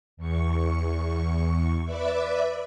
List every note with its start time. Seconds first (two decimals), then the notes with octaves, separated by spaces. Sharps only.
0.17 E2 C#6
1.84 B4 D5 E5 D6